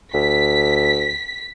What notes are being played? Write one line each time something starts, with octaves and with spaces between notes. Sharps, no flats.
D2 B6